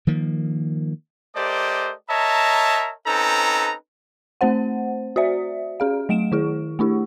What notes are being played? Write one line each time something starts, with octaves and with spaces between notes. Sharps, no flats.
D#3 F3 A#3
A3 G4 A#4 C5 D5 D#5
A#4 C#5 D#5 E5 A5 A#5
C4 C#4 D#4 A4 B4 A#5
A3 C4 C5 F#5
F#4 C5 D5 E5
C#4 G#4 F5
F#3 A3 D7 E7
D#3 E4 G#4
A3 D4 E4 G4